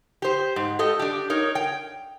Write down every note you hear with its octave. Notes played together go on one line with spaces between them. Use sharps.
G4 C5
G#2
G4 A4 D#5
D4 G4
D#4 A#4 C#5
G5